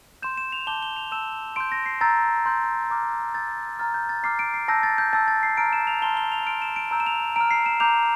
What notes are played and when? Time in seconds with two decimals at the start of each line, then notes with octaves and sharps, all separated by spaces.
0.22 C6 G6 E7
0.38 E7
0.52 F7
0.67 A5 D6 G6 G7
0.82 G7
0.96 F7
1.11 A5 E6 G6 E7
1.56 C6 G6 D7
1.72 A#6
1.86 C7
2.01 A#5 E6 G6 A6
2.46 C6 G6
2.90 A#5 D6 F6
3.34 A#5 E6 G6 A6
3.79 A#5 F6 A6
3.94 G6
4.09 A6
4.23 A#5 D6 F6 C7
4.39 D7
4.54 C7
4.68 A5 E6 G6 A#6
4.83 A6
4.98 G6
5.13 A5 E6 G6 A6
5.28 A6
5.43 C7
5.57 A#5 F6 D7
5.73 E7
5.87 F7
6.02 A5 C6 F6 G7
6.17 G7
6.32 F7
6.46 C6 F6 D7
6.62 E7
6.76 D7
6.91 A#5 E6 G6
7.00 E7
7.06 F7
7.36 A#5 F6 D7
7.51 C7
7.66 E7
7.80 A#5 D6 G6 F7